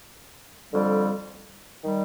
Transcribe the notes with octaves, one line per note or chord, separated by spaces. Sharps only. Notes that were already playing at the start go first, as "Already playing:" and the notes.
F2 D3 G3
D#3 G3